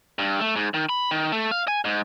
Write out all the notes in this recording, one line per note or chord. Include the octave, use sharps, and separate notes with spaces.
G2
A3
G#2
D#3
B5
D#3
A3
F5
G#5
G#2